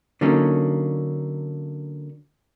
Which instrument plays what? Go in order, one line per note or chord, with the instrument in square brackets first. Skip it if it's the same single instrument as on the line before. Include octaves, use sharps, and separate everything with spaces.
[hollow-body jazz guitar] D3 F#3 A#3 C#4 D#4